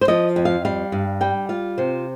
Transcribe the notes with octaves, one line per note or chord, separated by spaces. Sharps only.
C5
F3 D#5
F2
F5
G3 F5
G2
G3 G5
F4 F5
C3 C5